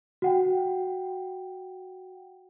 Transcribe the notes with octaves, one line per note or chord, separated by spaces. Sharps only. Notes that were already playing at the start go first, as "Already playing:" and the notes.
F#4 F#5 G5